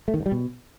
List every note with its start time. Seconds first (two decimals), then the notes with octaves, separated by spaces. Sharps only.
0.08 A3
0.14 D#3
0.20 G2
0.26 G3
0.32 B2